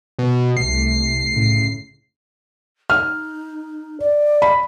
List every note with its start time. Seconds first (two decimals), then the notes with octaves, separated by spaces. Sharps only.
0.19 B2
0.57 C2 C3 A3 C7
1.32 A2 C#3
2.90 D#4 F6
4.00 D5
4.42 B5